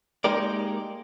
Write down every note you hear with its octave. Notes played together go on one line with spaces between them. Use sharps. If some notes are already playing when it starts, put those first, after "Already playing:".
G#3 A#3 D#4 G4 A#4 D5